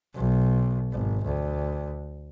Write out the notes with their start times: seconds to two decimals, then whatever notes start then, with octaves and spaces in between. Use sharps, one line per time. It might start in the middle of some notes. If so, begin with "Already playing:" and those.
0.14 B1
0.92 G#1
1.25 D2